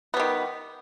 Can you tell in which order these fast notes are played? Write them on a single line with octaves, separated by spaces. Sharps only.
B3 G3 D#3